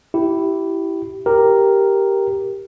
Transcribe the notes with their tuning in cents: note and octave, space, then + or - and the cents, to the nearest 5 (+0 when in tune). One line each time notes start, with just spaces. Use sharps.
E4 +0 G4 -20
G4 +0 A#4 +0